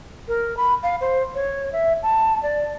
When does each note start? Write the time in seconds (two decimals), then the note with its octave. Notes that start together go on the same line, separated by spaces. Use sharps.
0.28 A#4
0.57 B5
0.83 F5
1.01 C5
1.35 C#5
1.73 E5
2.03 A5
2.43 D5